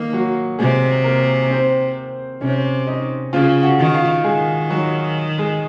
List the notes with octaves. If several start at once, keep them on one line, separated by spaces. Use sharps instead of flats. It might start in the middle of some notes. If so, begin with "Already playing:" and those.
Already playing: D#3 A#3 D#4
F#3 F#4
C3 G#3 G#4
A#3 A#4
C4 C5
C3 C#4 C#5
D#4 D#5
C#3 F4 F5
F#4 F#5
D#3
F4 F5
D#3 G#3 G#4
F#3 F#4
G#3 G#4